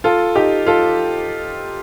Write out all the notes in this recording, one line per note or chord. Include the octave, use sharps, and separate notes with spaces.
F4 A4
D#4 G4
F4 A4